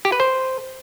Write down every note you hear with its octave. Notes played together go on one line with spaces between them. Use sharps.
G4
B4
C5